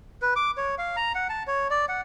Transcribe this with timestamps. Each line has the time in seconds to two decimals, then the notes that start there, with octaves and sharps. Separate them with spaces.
0.22 B4
0.36 D6
0.58 C#5
0.78 F5
0.97 A#5
1.15 F#5
1.29 A5
1.47 C#5
1.70 D5
1.89 F#5